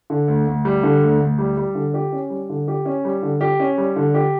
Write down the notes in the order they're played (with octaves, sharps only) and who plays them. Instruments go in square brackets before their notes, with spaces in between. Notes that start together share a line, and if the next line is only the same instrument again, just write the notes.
[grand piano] D3
D2
D2
G3
D3
D2
D2
G3
G3
D3
G4
C#4
G3
D3
G4
C#4
G3
D3
G4
C#4
G3
D3
G4